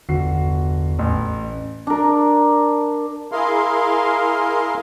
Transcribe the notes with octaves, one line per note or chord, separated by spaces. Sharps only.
G1 E2 F#4 C7
A1
D4 A#4
E4 G#4 A#4 F5 C6